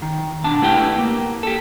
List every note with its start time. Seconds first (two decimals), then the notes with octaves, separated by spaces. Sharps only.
0.02 D#3
0.44 B2 D4 A5
0.62 A3 B3 E4 G4 G5
0.98 A#3
1.43 G4 A4